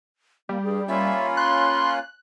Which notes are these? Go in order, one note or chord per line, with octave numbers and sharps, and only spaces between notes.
G3 A#3
G2 G#4
A#3 C#4 F4 E5 B5
C6 F#6